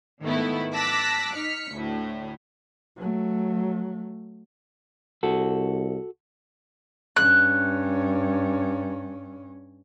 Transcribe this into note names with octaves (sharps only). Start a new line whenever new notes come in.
G#2 D#3 A3 B3 E4
A5 D6 E6 F#6 A#6 B6
D#4 F6 B6 C#7
D2 A2
F#3 A3
C2 F#4 A4
G2 C#4 F#6